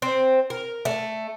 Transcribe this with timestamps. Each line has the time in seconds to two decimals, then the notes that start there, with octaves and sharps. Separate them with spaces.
0.02 C4
0.50 A#4
0.85 A3